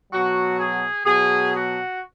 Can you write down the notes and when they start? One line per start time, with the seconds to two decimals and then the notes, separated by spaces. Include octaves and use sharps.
0.12 B2 F#3 F#4
0.58 G#4
1.04 B2 F#3 G#4
1.51 F#4